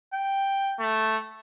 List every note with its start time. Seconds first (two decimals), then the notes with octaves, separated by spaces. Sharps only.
0.13 G5
0.80 A3